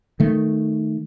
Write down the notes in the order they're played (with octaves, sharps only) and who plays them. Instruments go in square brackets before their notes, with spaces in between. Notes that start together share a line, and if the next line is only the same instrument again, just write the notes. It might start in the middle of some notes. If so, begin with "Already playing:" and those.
[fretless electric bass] D#3 A3